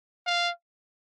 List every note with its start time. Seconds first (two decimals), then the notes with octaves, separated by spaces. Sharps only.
0.26 F5